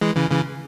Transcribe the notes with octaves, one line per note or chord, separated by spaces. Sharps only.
E3 G#3
C#3 E3
C#3 E3